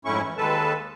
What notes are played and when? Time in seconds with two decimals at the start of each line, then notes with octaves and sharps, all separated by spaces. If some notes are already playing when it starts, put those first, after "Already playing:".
0.05 F2 G#2 A3 C#4 E4 C#6
0.23 E3
0.37 D#2 D#3 G#3 A4 B4 A5